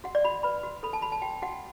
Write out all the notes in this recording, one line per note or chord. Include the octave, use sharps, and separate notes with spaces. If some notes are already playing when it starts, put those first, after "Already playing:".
F#4 F#5
D5
F#4 B5
B4 B5
F#4
A4 B5
A5
F#4 B5
A5
F#4 G5
F#4 F#5